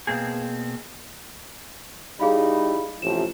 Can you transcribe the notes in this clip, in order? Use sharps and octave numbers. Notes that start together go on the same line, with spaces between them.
B2 E3 A#3 C4 G#4
G3 D#4 E4 G#4 F5 B5
A1 C3 F3 E7